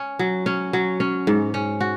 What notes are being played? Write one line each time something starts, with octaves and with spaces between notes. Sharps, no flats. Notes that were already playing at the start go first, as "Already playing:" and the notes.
Already playing: C#4
F#3
C#4
F#3
C#4
G#2
C#4
F#4